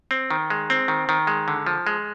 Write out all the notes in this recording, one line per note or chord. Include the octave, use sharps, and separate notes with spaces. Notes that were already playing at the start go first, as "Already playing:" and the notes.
C4
D#3
G#3
C4
D#3
D#3
G#3
D3
F3
G#3